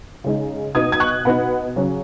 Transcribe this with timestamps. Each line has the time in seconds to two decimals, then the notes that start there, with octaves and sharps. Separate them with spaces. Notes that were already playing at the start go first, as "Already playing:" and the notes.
0.24 C#3 G#3 D#4
0.75 B2 B3 D#4 D#6 G#6
0.92 G#6
1.00 C#6 F#6
1.25 B2 B3 D#4 F#5 B5
1.76 C#3 F#3 C#4